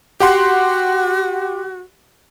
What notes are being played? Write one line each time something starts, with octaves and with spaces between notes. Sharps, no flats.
F#4 G4 F#5 C6